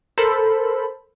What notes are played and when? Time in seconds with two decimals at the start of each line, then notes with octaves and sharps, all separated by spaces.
0.18 A4 A#4 C5 B5